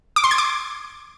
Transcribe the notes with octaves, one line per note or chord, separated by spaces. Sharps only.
D6
C6
G#6
D6